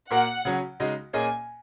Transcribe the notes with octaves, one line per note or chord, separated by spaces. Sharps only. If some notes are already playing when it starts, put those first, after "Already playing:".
A#2 A#3 F#4 A#4 F#5
C#3 F#3 C#4
C#3 G#3 D#4 F#4 D#5
A#2 A#3 C#4 G#4 D#5 G#5